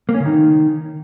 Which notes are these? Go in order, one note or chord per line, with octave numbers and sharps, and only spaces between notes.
A#3
C#4
C#3
D#3